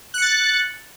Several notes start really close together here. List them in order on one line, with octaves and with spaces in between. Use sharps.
F#6 C#7 A6